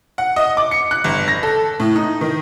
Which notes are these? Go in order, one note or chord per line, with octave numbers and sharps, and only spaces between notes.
F#5
D#5
D6
C#7
F#6
G1
A#6
A4
A2
D#4
D#3